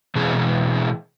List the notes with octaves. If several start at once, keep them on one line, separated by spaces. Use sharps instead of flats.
B2 E3 G#3 C4 G#4